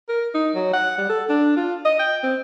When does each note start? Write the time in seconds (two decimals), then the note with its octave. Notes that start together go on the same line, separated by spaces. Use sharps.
0.09 A#4
0.34 D#4
0.55 F#3
0.73 F#5
0.98 G3
1.09 A4
1.29 D4
1.57 F4
1.85 D#5
1.99 G5
2.23 C4